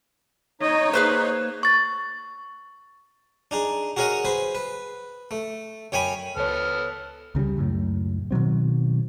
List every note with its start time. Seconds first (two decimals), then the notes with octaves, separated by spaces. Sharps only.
0.61 D#4 C#5 D#5
0.93 A#3 G#4 B4 C5
1.63 C#6 A6
3.51 D4 D#4 G#4
3.97 F#4 G#4 A#4 C#5 D#5 F#5
4.25 G#4 B4 C5
4.55 B4
5.31 A3
5.92 F#2 C#5 G5 G#5 B5
6.37 C#2 B3 A4 C#5 F6
7.35 C#2 C#3 F#3 G3
7.57 C#2 F#2 A2
8.31 B2 D#3 F#3 C4